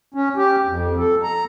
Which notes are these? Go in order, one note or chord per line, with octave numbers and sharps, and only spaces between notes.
C#4
G4
F2
A4
A#5